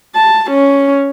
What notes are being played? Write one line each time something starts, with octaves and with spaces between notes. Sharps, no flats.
A5
C#4